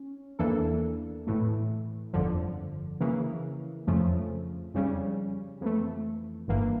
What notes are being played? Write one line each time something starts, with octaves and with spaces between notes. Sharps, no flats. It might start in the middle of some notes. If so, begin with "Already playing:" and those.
Already playing: C#4
E2 E3 A#3 D4 A4
A2 E3 A3
G1 F2 D3 F3
C#3 E3 A#3
F2 C#3 F3 A3
F2 C#3 G3 C#4
F2 E3 A3
G1 G2 E3 A#3